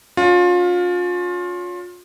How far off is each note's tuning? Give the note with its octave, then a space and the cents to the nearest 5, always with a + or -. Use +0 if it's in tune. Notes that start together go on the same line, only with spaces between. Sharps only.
C#4 +30 F4 +30